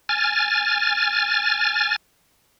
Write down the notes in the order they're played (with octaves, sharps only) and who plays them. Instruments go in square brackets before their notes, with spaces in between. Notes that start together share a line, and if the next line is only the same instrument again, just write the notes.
[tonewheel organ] G#5 F6 A6